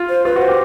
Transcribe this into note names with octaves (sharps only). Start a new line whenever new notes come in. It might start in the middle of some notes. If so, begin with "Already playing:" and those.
Already playing: F4
C5
F4 B4
F#4
C5
G4